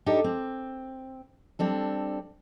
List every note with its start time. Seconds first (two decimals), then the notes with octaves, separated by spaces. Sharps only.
0.06 D4 D#4 G4 A4
0.24 C4
1.59 G3 C4 D4 A4